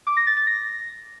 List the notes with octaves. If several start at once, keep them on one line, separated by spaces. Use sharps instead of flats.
D6
A#6
A6
A6
A#6